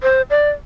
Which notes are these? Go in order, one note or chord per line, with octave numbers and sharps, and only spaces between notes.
C5
D5